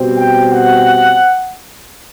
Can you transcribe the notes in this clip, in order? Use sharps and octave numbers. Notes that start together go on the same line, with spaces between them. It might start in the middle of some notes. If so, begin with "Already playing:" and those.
Already playing: B2 G3 C4
G5
F#5